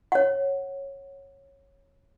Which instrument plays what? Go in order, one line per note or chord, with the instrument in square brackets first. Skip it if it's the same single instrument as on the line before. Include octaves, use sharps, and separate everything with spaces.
[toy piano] C#5 F#5